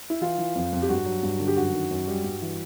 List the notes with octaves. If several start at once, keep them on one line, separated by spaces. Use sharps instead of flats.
E4
E3 F4
E3
F2
F2
G4
G2 F#4
F#3
G2
D3
G4
F#2 F#4
D#3
F#2
G3
G2
E3